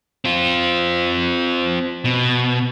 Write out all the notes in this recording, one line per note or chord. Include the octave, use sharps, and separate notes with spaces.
C4 F4
B2